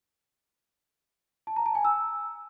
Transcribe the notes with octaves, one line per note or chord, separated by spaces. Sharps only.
A5
A#5
A5
G#5
E6